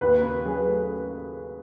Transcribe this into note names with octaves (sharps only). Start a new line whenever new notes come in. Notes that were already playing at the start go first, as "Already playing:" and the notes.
D#2 B4
C#3
F#3 G#4
A3